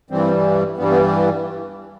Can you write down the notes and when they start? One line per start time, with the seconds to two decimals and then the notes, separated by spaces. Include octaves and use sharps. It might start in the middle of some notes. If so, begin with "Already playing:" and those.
0.11 G2 E3 G3 C4
0.77 G2 E3 G3 B3
0.91 B3